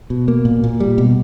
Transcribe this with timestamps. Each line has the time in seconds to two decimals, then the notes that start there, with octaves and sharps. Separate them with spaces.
0.10 B2
0.28 A#3
0.45 A#2
0.64 A#2
0.80 G3
0.98 B2